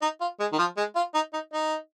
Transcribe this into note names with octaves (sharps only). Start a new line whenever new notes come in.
D#4
F4
G#3
D#3
F3
G#3
F4
D#4
D#4
D#4